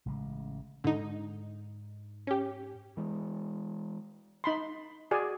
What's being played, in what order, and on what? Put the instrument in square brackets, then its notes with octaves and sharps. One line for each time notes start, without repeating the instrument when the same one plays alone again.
[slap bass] A1 C#3 G#3
[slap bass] G#2 [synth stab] D3 D#4
[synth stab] C#4 G4
[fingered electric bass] E3 G#3
[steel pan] D#4 B5 C6
F#4 G#4 D5 G#5